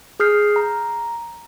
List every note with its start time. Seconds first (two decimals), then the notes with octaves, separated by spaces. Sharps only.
0.20 G#4 D#6 F6 G6 C7
0.56 A#5